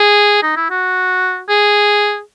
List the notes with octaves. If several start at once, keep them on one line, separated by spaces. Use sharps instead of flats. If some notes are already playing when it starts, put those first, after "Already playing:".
Already playing: G#4
D#4
E4
F#4
G#4